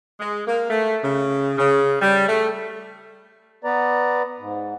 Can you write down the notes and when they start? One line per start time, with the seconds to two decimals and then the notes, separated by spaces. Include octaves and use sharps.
0.20 G#3
0.47 A#3
0.69 A3
1.03 C#3
1.58 C#3
2.01 G3
2.27 A3
3.64 B3 B4 D5 A#5
4.39 G#2